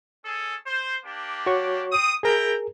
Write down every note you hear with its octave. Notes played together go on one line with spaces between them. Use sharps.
C#4 G#4 A4
C5
A#3 D4 G4
F#4 C#5 C#6
C4 D#6
E4 G#4 A#4 G5 A#5